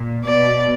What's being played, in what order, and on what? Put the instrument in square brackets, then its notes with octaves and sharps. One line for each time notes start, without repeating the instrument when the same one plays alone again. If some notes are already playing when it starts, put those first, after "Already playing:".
Already playing: [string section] A#2
[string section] B2 [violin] D5